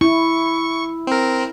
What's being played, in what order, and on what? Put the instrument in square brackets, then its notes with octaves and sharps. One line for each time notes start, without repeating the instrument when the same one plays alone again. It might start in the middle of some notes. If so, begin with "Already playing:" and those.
[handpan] E4 [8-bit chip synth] C#6
[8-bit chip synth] C4 A#4